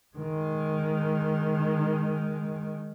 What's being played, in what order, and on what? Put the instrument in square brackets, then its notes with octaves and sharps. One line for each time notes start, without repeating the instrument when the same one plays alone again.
[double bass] D#3 G#3